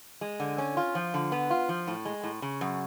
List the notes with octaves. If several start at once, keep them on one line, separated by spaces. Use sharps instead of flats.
G#3
D3
C#4
F4
F3
D3
B3
F4
F3
A2
G#3
A2
C#3
F#2